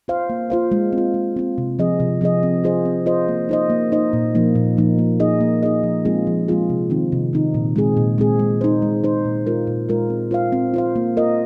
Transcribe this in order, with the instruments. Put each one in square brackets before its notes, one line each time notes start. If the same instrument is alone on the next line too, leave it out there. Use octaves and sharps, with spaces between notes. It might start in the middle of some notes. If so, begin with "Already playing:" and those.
[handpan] F4 C5 F5
A#3
F4 C5 F5
G#3
C4
F4
G#3
C4 F4
C3
F3 C4 G#4 D#5
C3
F3 C4 G#4 D#5
C4
F4 G#4 C5 D#5
C4
F4 G#4 C5 D#5
A#3
D#4 C5 D#5
A#3
D#4 C5 D#5
A#2
F3 A#3 D#4
A#2
F3 A#3 D#4
A#3
D#4 G#4 D#5
A#3
D#4 G#4 D#5
F3
G#3 C4 F4 G#4
F3
G#3 C4 F4 G#4
C3
D#3 C4 D#4
C3
D#3 C4 D#4
A#2
G#3 C4 G#4
A#2
G#3 C4 G#4
G#3
D#4 C5
G#3
D#4 C5
A#2
G#3 F4 A#4
A#2
G#3 F4 A#4
C4
F4 C5 F5
C4
F4 C5 F5
A#3
F4 A#4 D#5